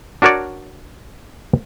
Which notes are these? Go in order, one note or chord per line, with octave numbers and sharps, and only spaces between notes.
D4 F#4 A#4 C#5 D5